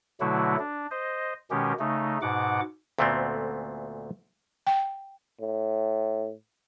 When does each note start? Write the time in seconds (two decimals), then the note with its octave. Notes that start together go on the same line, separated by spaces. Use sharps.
0.20 B2 D3 F#3 A3 E4 F#4
0.59 D4
0.91 C5 D#5
1.51 B2 D#3 G#3 C#4 G4
1.79 C#3 A3 D#4
2.22 G#2 B2 F#5 D6
2.98 D2 A#2 A3 B3 C4
4.67 G5
5.40 A2